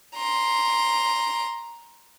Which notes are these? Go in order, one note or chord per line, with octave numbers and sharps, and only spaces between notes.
A#5 C6